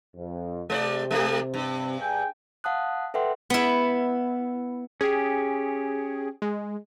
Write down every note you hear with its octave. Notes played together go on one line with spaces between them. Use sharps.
F2
C3 G#3 C5 D5
G#3 A3 G4
G2
G#4 G5 G#5
F5 F#5 A5 D#6 F#6
A4 B4 E5 F#5 G5 C6
B3 E4
C#4 G4 G#4
G#3